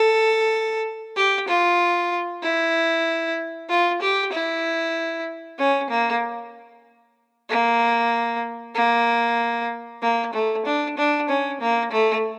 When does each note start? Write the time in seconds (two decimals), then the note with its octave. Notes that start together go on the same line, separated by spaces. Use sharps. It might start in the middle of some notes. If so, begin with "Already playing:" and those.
Already playing: A4
1.16 G4
1.48 F4
2.43 E4
3.70 F4
4.02 G4
4.33 E4
5.59 C#4
5.90 A#3
7.50 A#3
8.75 A#3
10.02 A#3
10.33 A3
10.66 D4
10.98 D4
11.29 C#4
11.61 A#3
11.92 A3